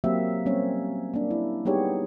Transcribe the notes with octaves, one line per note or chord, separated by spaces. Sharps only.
F#3 A#3 C4 G4 E5
G3 A#3 C4 C#4 C#5
A#3 C4 D4
E4
G3 B3 D#4 G4 G#4 C#5